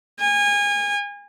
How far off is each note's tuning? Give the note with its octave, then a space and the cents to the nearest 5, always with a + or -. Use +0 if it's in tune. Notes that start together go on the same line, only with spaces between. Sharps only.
G#5 -30